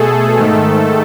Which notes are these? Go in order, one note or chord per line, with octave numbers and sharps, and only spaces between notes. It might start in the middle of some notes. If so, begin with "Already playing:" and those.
Already playing: B2 A3 G#4 A4
G#2 D#3 A3